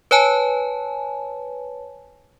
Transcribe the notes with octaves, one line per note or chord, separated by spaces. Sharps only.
B4 C#5 G#5 A5